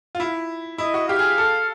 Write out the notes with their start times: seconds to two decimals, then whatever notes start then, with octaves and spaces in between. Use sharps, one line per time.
0.15 F4
0.20 E4
0.78 E4 D#5
0.94 F#4
1.08 G4 F5
1.19 G#4
1.38 A4